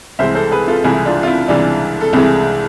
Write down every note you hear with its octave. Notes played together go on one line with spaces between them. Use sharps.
C2 C3 E3 G#3 C5 E5
A4 C5
G#4 B4
F4 A4
C2 C3 E3 G#3 E4 G#4
D4 F4
F4
E4
C2 C3 E3 G#3 D4
A4
C2 C3 E3 G#3 E4 G#4